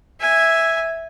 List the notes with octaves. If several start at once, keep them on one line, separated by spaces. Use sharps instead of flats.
E5 G#5